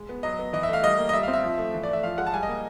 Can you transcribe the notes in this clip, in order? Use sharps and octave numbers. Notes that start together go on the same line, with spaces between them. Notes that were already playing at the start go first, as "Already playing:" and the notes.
Already playing: G#3
B3
F#3 D#5
B3
E3 D#5
E5
A3 F5
G3 D#5
A#3
D#5
G3 E5
C4 F5
E5
F3
A3
E3
D5
A3 E5
F3 F5
G#3 F#5
A5
G3 G#5
D#5
A#3